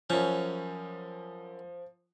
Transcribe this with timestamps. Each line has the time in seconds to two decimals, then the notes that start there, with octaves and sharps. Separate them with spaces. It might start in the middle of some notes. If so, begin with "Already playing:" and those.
0.10 F#2 F3 C#4